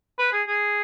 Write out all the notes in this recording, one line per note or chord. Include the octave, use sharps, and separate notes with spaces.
B4
G#4
G#4